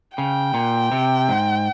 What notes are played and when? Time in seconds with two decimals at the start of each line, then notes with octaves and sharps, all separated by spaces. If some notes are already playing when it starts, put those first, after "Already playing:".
0.17 C#3 G5
0.54 A#2
0.92 C3
1.29 G#2